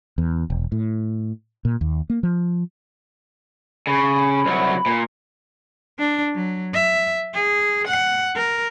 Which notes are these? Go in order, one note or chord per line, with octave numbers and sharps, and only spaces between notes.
E2
E1
A2
A#2
D#2
A#3
F3
C#3 B5
C2 F#3
A#2
D4
F#3
E5
G#4
F#5
A#4